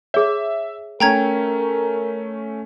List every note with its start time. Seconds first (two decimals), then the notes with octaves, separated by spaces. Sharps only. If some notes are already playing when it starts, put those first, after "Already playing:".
0.14 G#4 C#5 E5
1.00 A3 C#4 A#4 G5 A#5 G#6